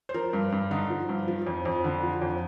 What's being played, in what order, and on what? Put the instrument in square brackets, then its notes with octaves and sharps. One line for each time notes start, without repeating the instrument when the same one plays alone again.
[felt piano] C5
F3 A#4
G2
G2
D3 D#4
F3
G2
F3
F2
F2
D3
F3
F2